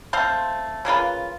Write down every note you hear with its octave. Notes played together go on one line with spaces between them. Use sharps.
A3 C4 C5 F5
C#3 A#3 F4 B4